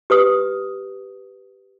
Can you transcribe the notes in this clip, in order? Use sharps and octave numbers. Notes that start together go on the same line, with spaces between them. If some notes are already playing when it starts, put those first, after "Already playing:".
G4 B4 D#6